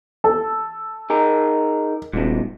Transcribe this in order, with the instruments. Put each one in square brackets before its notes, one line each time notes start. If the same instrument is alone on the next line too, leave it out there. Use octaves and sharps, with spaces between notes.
[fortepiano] A4
[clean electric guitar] D#4 G#4 A#4
[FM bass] D#1 [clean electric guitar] G#2 B2